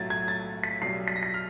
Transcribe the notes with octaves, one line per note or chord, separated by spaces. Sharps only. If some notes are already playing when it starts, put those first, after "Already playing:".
Already playing: B1 A2 F#3 G#6 A6
G#6
A6
B6
B1 B2 G3 C7
B6
A#6
B6
F6